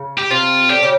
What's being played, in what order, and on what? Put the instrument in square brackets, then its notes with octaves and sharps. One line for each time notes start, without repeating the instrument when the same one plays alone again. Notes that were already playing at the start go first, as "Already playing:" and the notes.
Already playing: [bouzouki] C#3
[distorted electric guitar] G4
[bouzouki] C3 C4 [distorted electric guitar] F4
[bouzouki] D3 D4 [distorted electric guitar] G4
[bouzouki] C#3 C#4